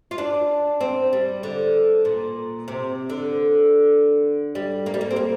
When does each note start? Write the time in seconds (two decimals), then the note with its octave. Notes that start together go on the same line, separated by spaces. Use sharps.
0.11 F4
0.18 D4
0.81 C4
1.13 G3
1.43 D3
2.05 A#2
2.68 C3
3.10 D3
4.55 G3
4.86 A#3
4.94 G3
5.01 A#3
5.11 C4
5.16 A#3